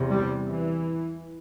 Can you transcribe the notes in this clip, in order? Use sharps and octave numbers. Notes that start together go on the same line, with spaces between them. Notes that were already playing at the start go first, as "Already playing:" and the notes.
Already playing: E2 C3
G3
E3